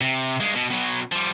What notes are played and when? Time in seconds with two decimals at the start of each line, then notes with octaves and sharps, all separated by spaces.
0.01 C3
0.41 G2 G#3
0.55 B2
0.71 B2 F#3
1.12 F3 G3